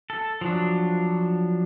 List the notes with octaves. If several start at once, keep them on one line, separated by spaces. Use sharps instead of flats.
A4
F3 F#3 D4